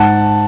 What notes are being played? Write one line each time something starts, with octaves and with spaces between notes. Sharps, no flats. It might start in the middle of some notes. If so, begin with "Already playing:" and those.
Already playing: G#2 F#5 A5